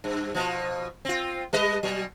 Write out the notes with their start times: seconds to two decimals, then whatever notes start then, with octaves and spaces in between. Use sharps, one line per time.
0.04 G2
0.34 B2 F3
1.05 C4 F4
1.53 G3 B4 D#5
1.83 B2 F#3